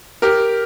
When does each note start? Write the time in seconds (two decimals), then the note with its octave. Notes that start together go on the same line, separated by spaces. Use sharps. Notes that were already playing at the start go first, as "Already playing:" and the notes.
0.22 G4 A#4